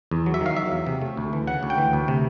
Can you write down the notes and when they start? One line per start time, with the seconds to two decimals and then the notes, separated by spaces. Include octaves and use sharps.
0.11 E2
0.26 F#3
0.34 E5
0.41 D#3 F5
0.57 F#3 E5
0.72 E2
0.87 C3
1.02 A3
1.17 D2
1.33 E3
1.47 C#3 F#5
1.63 D2
1.70 G5
1.78 E3
1.93 D2
2.08 C3